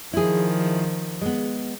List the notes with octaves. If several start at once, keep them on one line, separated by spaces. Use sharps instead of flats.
D#3 F3 E4 G#4
G#3 B3